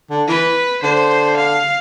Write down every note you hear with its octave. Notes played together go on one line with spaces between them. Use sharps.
D3
E3 B4
D3 C5
F5